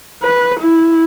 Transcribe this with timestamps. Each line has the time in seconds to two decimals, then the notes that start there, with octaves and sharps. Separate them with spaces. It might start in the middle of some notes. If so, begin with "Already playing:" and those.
0.24 B4
0.60 E4